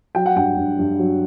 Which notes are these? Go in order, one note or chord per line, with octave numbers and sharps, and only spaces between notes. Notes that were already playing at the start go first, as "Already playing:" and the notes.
F#3 G5
F#5
G2 G5
G2
G2
F#3